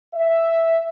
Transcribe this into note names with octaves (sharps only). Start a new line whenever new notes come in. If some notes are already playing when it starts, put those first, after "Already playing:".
E5